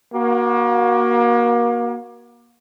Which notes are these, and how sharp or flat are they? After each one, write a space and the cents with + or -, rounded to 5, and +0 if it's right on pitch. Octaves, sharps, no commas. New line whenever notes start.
A#3 +30 F#4 +0